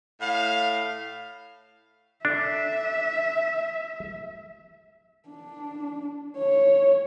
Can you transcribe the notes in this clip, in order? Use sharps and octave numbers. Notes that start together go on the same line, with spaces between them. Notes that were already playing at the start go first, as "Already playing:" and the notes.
A2 F5
D4 A4 E5
D4
C#5